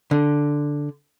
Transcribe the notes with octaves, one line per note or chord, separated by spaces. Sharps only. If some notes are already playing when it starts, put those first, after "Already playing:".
D3